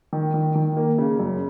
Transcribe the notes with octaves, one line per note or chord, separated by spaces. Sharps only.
D#3
D#3
D#3
A#3
C#3
F#2